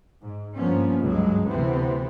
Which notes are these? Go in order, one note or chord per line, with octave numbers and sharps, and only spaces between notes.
G#2
G2 F3 A#3 B3 C#4
G#1 C#2 G2 F#3 G#3
D2 C3 E3 B3 C4